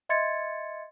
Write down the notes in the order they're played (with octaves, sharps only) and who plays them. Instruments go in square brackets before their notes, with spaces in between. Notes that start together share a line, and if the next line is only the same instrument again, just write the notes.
[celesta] D#5 E5 C6 G#6 A6 C#7